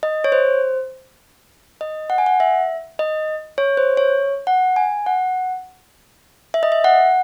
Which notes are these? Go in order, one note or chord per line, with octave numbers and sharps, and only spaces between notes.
D#5
C#5
C5
D#5
F#5
G#5
F#5
E5
D#5
C#5
C5
C#5
F#5
G#5
F#5
E5
D#5
E5
F#5